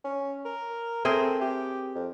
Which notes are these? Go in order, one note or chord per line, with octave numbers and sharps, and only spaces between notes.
C#4
A#4
A3 C4 G#4 A#4
G4
F2